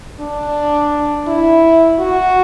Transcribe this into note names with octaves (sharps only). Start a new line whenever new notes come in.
D4
E4
F#4